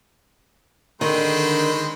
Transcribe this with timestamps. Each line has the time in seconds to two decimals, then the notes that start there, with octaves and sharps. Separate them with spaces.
1.01 D3 D#3 G#3 C4 B4